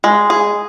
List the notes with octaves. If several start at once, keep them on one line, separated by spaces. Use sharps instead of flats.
G#3
G#4